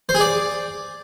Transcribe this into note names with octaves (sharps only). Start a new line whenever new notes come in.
C5
G#4
D5